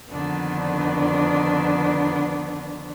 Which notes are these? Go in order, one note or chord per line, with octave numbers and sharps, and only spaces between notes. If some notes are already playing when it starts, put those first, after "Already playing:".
F2 D3 D#3 B3 D4